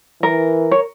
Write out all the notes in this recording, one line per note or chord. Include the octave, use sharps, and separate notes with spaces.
E3 A#4
C#5